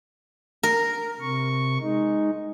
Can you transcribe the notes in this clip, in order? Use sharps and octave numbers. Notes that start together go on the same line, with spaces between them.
A#4
C3 C#6
G#3 D#4